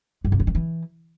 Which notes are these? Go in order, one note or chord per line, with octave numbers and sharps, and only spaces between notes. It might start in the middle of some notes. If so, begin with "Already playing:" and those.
G2
C3
F#3
D#3
E3